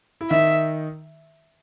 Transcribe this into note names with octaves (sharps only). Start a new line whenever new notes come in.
E4
D#3 D#4 E5